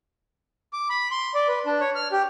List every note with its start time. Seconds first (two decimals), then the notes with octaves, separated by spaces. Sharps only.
0.73 D6
0.90 B5
1.11 C6
1.34 D5
1.48 B4
1.66 D4
1.81 C#5
1.95 F6
2.12 G4